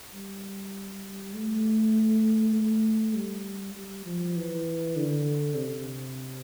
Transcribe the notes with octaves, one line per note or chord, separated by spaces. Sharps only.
G3
A3
A3
G3
G3
F3
E3
D3
C3